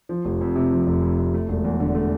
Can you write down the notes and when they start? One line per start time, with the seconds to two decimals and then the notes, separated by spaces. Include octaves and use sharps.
0.09 F3
0.25 F1
0.41 F2
0.55 C3
0.72 F3
0.87 F1
1.02 F2
1.18 C3
1.34 A3
1.49 E1
1.64 E2
1.80 D3
1.95 A3